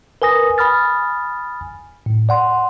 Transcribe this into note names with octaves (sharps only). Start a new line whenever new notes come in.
A#4 B4 G#5 D#6 A#6
G#5 B5 D#6 F6 A6
A2
D5 F#5 C6